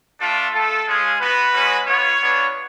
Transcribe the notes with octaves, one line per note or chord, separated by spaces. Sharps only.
A3 D4 F4 A4
A3 F4 A4
G#3 C#4 F4 G#4
B3 F#4 B4
G#3 C#4 F#4
B3 F4 C#5
B3 D4 F4